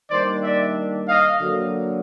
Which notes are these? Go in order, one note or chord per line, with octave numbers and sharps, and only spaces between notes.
D#3 G3 A#3 D4 C5 D5
D5 E5
D#5 F5
D3 F#3 A#3